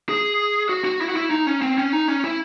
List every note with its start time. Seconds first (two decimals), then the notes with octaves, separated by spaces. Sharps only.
0.09 G#4
0.69 F#4
0.85 F#4
1.01 E4
1.09 F#4
1.17 E4
1.31 D#4
1.47 C#4
1.62 C4
1.78 C#4
1.93 D#4
2.08 C#4
2.24 E4